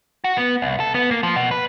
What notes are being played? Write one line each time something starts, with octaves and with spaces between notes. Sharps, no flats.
F#4
B3
C2
A4
B3
A#3
F3
B2
B4